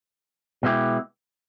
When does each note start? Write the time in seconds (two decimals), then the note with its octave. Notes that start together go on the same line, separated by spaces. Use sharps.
0.63 B2 G#3 B3 E4 G4